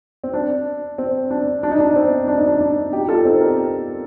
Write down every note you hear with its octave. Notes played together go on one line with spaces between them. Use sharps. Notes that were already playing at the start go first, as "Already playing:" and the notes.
C4
D4
C4
D4
D4
D#4
D4
C4 D#4
D4
D#4
D4
D4
D#4 G4
G4
F4 A4
C4 D#4
G4 A#4